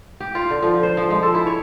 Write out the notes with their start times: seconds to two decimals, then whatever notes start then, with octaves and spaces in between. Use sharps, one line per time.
0.20 G4
0.35 F4
0.50 D3
0.62 F3
0.83 C5
0.97 F3
1.10 G#3
1.23 A4
1.34 E4
1.46 C#5